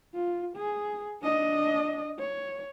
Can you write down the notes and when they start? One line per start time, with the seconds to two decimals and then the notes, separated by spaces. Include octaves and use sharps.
0.14 F4
0.56 G#4
1.21 D4 D#5
2.19 C#5